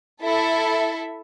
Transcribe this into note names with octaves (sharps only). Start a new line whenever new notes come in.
E4 A4 E5